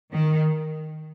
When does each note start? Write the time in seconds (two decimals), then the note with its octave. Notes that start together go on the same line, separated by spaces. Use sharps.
0.13 D#3